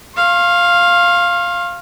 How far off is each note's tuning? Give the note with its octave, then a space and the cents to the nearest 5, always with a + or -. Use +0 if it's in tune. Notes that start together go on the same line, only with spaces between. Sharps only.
F5 +0 C6 +45